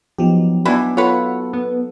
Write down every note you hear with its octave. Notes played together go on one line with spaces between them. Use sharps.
F3 F#3 B3 D#4 G4
E3 B3 D4 E4 F#4
F4 A4 B4 C#5 F#5
B3